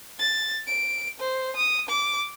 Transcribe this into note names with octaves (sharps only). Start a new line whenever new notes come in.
A6
D7
C5
D#6
D6